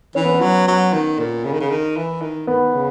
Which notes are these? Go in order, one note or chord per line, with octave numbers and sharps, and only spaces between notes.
E3 C#4
B3
C#4
F#3
F#3
D#3
A#2
C#3
D#3
C#3
D#3
E3
D#3
D#3 B3
C#3